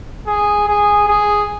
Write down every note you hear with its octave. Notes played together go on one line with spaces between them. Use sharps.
G#4
G#4
G#4